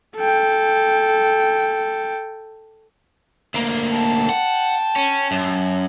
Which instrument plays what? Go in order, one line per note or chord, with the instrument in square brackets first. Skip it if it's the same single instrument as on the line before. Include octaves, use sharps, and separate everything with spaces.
[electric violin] A4 G5
[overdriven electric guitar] D2 A#3
[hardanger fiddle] G5 A5
[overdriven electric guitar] F#5
C#4
F#2